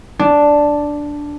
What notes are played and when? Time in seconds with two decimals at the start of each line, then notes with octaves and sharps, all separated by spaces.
0.19 D4